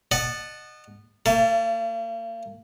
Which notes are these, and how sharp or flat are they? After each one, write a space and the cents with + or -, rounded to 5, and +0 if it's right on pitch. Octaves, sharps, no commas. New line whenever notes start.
D#5 -30 F#5 +0 A5 +0
A#3 -40 E5 +45 A5 +0